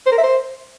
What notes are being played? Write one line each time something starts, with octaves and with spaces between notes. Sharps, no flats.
C5
A#4
E5
C5